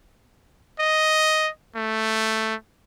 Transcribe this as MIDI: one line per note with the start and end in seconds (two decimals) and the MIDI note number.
0.80 1.49 75
1.76 2.55 57